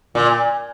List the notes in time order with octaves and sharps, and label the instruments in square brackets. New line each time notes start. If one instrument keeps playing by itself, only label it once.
[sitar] A#2